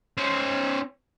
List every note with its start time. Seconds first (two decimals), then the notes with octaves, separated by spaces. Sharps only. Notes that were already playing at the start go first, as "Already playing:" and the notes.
0.17 C#4 C5